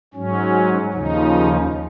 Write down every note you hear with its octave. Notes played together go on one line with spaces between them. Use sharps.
G#2 F#3 C#4
D#2 C#3 F3 D#4